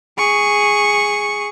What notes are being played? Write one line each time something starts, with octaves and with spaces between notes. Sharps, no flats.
G#4 C#6